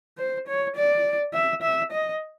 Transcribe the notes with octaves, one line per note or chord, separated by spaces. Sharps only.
C5
C#5
D5
E5
E5
D#5